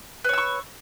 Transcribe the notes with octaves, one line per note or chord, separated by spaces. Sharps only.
B4 C#5 C#6 E6